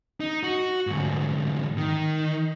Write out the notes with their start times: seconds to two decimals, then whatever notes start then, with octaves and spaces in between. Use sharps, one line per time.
0.20 D#4
0.43 F#4
0.87 D2 G#2
1.77 D#3